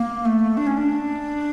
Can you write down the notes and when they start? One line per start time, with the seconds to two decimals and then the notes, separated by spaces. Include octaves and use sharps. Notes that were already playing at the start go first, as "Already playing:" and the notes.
Already playing: A#3
0.25 A3
0.57 D4
0.67 C#4
0.77 D4